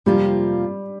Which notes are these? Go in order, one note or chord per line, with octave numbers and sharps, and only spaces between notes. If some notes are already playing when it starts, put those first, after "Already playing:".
F2 C3 F3 G3 A#3 F4